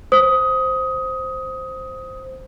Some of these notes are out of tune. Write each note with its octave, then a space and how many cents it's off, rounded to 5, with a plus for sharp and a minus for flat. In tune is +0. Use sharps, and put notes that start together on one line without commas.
C5 +0 D#6 +15